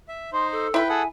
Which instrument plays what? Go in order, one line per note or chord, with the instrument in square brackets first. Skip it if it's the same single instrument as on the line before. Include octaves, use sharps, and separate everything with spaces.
[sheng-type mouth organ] E5
[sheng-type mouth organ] D#4 C5 [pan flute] C6
[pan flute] A4
[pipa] E4 B5 [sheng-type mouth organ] B4 G5
[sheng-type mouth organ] G#4 A4 F#5 [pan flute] G#5